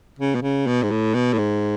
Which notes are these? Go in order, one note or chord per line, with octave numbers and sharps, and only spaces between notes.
C#3
B2
C#3
B2
G#2
A2
B2
A2
G#2